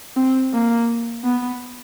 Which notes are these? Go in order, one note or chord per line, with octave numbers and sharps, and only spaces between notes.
C4
A#3
B3